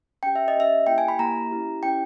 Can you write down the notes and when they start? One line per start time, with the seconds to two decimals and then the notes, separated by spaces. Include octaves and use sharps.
0.23 C#4 G4 G5
0.36 E5
0.48 D#5
0.55 C#4 G4 E5
0.87 A#3 E4 G4 G5
0.98 G#5
1.08 B5
1.19 A#3 E4 G4 A#5
1.51 C#4 E4 G4
1.83 C#4 E4 G4 G5